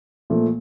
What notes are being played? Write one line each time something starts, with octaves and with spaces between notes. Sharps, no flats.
A#2 F3 A3